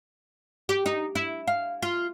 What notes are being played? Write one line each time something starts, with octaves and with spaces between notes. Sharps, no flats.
G4
D#4
E4
F5
F4